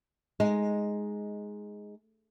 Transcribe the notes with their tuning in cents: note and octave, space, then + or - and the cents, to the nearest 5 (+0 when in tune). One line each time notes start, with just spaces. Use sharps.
G#3 +0 D#4 +0